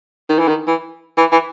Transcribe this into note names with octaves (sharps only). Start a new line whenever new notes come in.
D#3
E3
D#3
E3
E3
E3